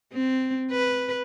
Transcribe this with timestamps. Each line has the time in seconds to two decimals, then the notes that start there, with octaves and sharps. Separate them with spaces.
0.13 C4
0.71 B4